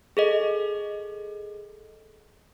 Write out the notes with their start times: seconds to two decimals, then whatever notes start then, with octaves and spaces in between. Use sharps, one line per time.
0.17 G#4 A4 D#5